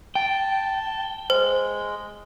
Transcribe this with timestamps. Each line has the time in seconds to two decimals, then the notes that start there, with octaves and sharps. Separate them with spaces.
0.15 G5 A5
1.30 G#3 C5